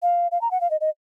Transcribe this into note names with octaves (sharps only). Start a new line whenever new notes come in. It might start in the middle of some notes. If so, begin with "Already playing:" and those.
F5
F5
A#5
F#5
F5
D#5
D#5